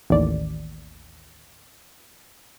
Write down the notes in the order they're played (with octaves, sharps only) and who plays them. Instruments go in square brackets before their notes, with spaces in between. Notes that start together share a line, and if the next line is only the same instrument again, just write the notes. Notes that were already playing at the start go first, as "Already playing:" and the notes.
[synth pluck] A1 D#2 D5